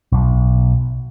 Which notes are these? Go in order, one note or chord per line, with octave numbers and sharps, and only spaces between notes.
B1